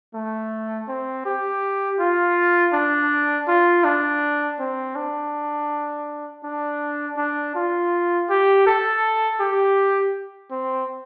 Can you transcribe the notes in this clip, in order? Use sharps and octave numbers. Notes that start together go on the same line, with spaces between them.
A3
C4
G4
F4
D4
F4
D4
C4
D4
D4
D4
F4
G4
A4
G4
C4